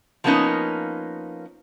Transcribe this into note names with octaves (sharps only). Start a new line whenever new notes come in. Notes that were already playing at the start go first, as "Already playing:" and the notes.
F3 F#3 A#3 B3 C#4 D#4